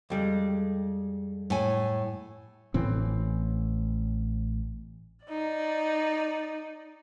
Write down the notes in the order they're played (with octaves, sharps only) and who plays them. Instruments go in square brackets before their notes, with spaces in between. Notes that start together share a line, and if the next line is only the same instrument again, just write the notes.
[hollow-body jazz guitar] F2 G3 G#3
[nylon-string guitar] A2 G#5
[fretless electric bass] A1 A2 E3 C4
[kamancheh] D#4 D5